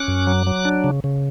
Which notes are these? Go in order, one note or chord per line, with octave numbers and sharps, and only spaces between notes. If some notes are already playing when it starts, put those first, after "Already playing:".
Already playing: C#4 D6 F#6
F#2
F#3
F#3
D4
C#3
C#3